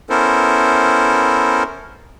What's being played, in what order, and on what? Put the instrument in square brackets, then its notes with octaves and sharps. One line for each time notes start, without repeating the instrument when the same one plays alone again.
[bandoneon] B3 C#4 E4 A4 A#4 C5